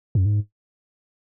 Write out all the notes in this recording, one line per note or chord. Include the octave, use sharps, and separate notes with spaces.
F#2
G#2